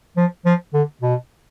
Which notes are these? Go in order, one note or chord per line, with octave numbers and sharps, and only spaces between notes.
F3
F3
D3
B2